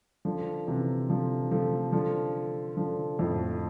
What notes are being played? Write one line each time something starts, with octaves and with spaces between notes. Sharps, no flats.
D3 F3
C3 E3
D3 F3
F3 A3
D3 F3
D3 F3
F2 A2